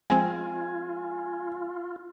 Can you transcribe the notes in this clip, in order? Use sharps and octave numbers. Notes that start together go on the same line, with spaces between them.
F3 G#3 C4 F4 G#5